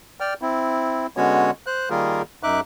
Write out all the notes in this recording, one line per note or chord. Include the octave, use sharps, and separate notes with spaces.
D5 G5 F6
C4 E4
D3 G#3 B3 C#4 F#4 C#5
C5 F#6
D#3 G3 A#3 F4 G#4 A#4
F#2 D#4 E5 D6 F#6